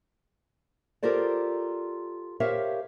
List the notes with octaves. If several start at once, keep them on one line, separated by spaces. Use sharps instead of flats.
F4 G4 A4 A#4 C5 D5
G4 A#4 C5 C#5 E5 F5